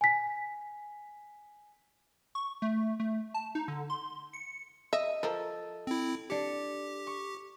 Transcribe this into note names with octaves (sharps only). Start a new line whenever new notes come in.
G#5 B6
C#6
A3
A3
A5
D#4
D3
C6
C#7
D#5 E5
F3 A4 A#4
C4 E4
D4 G4 C#7
C#6